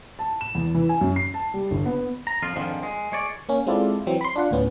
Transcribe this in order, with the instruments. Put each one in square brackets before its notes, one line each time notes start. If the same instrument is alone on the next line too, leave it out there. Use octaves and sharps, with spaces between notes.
[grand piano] A5
E7
E2
E3
G#5
F#2
C7
A5
G3
G1
B3
[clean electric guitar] A#5
F2 F3 F4
F2 G#2 D3 D#3 F3
G#3
G#3 C#5 D5
[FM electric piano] A#3 C#4
G#3 C4 E4 F4 A4 D5
E3 F#3 C4
B5 C6
D4 F4 F#5
D2 A2 B3 C#4